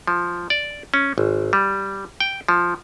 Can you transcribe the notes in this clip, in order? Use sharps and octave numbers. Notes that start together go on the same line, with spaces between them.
F3
D5
C#4
G#1
G3
G5
F3